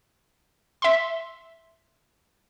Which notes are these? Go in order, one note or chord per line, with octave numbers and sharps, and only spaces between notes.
E5 C6